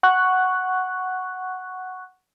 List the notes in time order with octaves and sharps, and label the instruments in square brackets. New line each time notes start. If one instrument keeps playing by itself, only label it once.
[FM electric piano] F#5 C#6 F#6